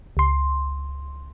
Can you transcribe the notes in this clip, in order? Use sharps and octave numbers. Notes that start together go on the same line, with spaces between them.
C#2 C6